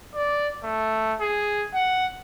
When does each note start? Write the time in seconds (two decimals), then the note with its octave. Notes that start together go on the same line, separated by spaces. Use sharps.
0.15 D5
0.64 A3
1.21 G#4
1.74 F#5